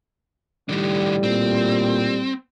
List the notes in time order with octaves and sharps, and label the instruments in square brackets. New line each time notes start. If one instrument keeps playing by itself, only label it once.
[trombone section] A2 G3 [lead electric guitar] D#3 D4
[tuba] A#2 [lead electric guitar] C4